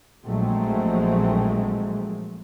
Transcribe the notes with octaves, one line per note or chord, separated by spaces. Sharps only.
A#1 F#3 G#3 A3 C4